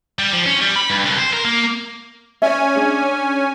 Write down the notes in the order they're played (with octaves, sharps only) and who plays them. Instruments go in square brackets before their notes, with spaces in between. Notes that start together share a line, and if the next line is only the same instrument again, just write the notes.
[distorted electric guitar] G3
F3
C#4
G3
B5
G2
C2
C5
A#4
A#3
[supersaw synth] C#4 G#5 [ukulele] C#5 D5 E5
[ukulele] D4 G#4